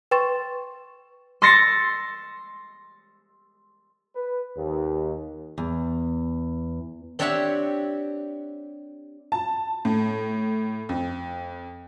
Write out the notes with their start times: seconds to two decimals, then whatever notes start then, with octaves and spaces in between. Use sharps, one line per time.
0.11 B4 G5 C6 C#6 A6 E7
1.42 C6 E6 A6 A#6 C7 C#7
4.16 B4
4.56 D#2
5.58 E2
7.19 C4 D4 G4 C#5 E5 F#5
9.32 A5
9.85 A2
10.89 F2